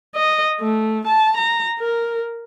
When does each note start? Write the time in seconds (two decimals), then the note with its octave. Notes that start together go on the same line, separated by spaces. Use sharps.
0.16 D#5
0.60 A3
1.07 A5
1.37 A#5
1.79 A#4